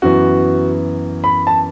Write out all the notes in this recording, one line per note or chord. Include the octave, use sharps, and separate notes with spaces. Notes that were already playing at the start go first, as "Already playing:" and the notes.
F#2 E3 B3 F#4
B5
A5